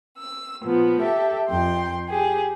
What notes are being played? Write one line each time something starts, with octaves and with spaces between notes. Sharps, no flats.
E6
A#2 F3 B3
G4 A4 E5
F2 G5 C6
G4 G#4